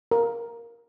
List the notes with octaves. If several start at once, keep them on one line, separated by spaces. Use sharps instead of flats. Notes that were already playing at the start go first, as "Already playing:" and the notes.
A#4